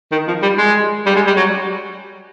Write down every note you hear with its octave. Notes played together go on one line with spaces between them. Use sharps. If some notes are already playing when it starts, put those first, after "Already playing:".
D#3
F3
G3
G#3
G3
G#3
G3
F#3